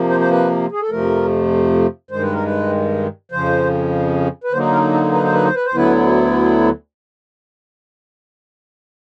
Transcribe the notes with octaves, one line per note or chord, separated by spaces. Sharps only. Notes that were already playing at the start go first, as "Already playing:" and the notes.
Already playing: C3 F3 A#3
C5
C5
B4
G#4
A4
F2 C3 F3 A3 A#4
G2 D#3 G#3 C5
B4
A#4
B4
F2 C#3 F3 C5
B4
D3 F#3 A#3 D#4 C5
A#4
A4
B4
C5
B4
C5
B4
C5
D2 D3 F#3 B3 E4 B4